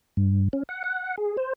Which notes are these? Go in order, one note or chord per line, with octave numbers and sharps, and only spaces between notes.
G2
C#4
F#5
F#5
G#4
C5